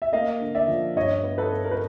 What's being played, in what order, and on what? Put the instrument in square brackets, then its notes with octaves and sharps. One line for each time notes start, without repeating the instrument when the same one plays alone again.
[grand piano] E5
A#3 D#5 F5
D3
D5 E5
F3
G2 C#5 D#5
B3
A4 B4
B3
A#4
B4